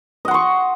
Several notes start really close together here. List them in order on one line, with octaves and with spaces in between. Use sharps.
D#5 F#5 C6 C#6